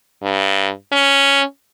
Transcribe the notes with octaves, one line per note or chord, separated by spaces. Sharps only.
G2
C#4